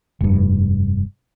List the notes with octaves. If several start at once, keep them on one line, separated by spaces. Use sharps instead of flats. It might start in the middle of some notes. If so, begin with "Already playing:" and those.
F1 G2